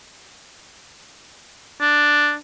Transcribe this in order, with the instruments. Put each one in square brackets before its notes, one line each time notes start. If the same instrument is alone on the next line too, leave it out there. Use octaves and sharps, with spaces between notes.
[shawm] D4